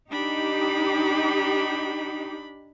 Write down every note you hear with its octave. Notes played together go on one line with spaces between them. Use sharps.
D4 D#4 G4 B5